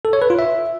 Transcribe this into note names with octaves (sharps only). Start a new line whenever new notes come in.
A4
C#5
B4
F4
E5